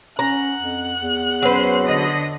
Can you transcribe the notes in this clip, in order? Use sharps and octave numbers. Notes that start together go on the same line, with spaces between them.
C#4 F#5 A#5 F#6
F2
E2
F#3 C#4 B4 C5
D3 D#5